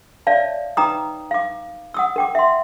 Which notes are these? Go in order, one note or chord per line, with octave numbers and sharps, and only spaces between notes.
C#5 D5 E5 F5 A5
D#4 B4 G5 A#5 D6 D#6
F5 D6
F#5 D#6 E6
A#4 G5 D6
E5 F#5 C6